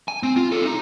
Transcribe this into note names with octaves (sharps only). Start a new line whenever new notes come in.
G#5
C4
F4
D#4 A4
D#4